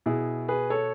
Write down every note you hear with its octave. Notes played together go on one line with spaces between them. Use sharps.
B2 E4 G#4
G#4 B4
A4 C#5